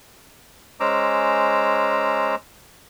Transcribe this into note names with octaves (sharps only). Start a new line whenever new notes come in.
G#3 C#4 C5 A#5 D6 E6